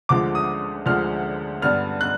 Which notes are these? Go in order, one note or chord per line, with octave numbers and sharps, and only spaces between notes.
D2 D3 F3 G#3 D6
D#6
D2 D3 F3 G#3 F6
G2 D3 G3 B3 F6
F#6